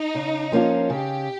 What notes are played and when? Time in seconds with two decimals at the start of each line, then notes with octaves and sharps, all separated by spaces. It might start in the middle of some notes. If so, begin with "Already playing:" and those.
Already playing: D#4
0.15 C#3
0.52 F3 A#3 C#4 F4
0.90 C#3 G4